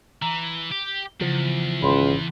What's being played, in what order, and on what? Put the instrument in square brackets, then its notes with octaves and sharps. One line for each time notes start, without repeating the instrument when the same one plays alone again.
[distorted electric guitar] E3 [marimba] A#5
[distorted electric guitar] G4
[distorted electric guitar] E2 [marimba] C#3 [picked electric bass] F3
[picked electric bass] G#1 C#4 [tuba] C#2 [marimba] B5 C6